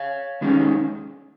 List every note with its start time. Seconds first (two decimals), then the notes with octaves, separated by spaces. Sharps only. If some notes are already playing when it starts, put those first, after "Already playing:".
Already playing: C#5 F5
0.41 D#2 D#3 G#3 C#4